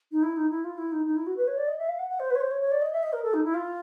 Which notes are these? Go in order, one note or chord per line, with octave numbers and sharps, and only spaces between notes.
D#4
E4
D#4
E4
F4
E4
D#4
D#4
E4
F#4
B4
C#5
D5
D#5
E5
F5
F#5
F#5
C5
B4
C#5
C5
C#5
C#5
D5
D#5
E5
D#5
A#4
A4
D#4
E4
F4